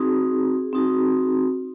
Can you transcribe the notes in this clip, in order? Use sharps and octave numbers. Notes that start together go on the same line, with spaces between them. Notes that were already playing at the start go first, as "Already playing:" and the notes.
Already playing: C4 D#4 F#4 G#4
C4 D#4 F#4